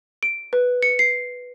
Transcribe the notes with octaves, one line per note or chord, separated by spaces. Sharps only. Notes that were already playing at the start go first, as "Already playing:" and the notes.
D7
B4
C#7
C7